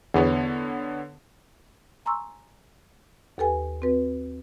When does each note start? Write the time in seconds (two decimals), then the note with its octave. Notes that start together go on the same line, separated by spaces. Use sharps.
0.14 E2 D3 B3 C#5
2.05 G#5 A#5 C6 C#6 E6
3.38 D#2 G4 A4 B4 G5 G#5
3.82 C4 F#4 B4